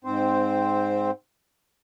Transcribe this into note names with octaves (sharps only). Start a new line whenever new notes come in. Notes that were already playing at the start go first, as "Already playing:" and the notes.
G#2 C4 C5